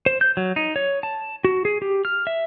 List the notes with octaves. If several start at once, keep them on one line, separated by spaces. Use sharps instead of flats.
C5
G6
F#3
D#4
C#5
A5
F#4
G#4
G4
F6
E5